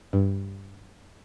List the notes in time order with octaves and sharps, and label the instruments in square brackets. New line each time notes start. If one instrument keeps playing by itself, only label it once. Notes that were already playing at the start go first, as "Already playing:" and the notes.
[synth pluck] G2